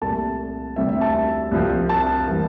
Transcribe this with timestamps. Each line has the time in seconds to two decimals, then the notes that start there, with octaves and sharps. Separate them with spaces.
0.01 C2 A#2 A3 A5
0.76 D2 C3 G3 C4 E5
0.89 E5
1.01 A5
1.51 C2 C3 F3 C4
1.89 A5
2.27 E3 G3 A#3